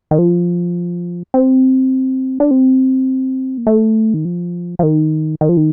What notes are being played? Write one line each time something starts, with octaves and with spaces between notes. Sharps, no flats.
D#3
F3
C4
D4
C4
A#3
A3
D#3
F3
F3
D#3
D#3
F3
D#3